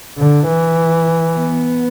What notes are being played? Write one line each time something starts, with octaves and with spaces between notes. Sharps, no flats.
D3
E3
B3